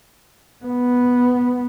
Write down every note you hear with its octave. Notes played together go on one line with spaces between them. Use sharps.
B3